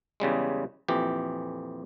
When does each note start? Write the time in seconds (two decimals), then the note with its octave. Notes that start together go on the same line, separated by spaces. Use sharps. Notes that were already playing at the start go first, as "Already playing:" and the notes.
0.20 E2 C#3 G3 G#3
0.88 A#1 F2 E3 G4